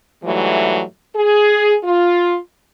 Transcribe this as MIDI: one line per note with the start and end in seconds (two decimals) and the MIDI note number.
0.24 0.82 44
0.24 0.82 52
0.24 0.82 54
0.24 0.82 55
0.24 0.82 57
1.15 1.75 68
1.84 2.37 65